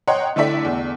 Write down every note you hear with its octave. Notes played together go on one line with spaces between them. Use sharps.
C#5 D#5 F#5 G5 A#5 C6
D3 A3 E4 D5 E5 B6
E2